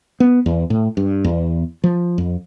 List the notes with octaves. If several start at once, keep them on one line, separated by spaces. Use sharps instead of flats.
B3
E2
A2
G2
E2
F3
F2